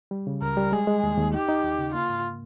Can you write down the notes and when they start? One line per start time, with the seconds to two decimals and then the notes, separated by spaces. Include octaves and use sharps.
0.11 G3
0.27 C#3
0.42 C#2 A#4
0.57 G3
0.72 G#3 G#4
0.87 G#3
1.03 D#2
1.18 D#2
1.33 D#4 G4
1.49 D#4
1.64 D#2
1.78 C#3
1.94 A#3 F4
2.09 G#2